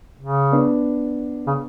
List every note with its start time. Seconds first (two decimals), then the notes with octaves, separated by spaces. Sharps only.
0.21 C#3
0.52 B3 D4
1.47 C#3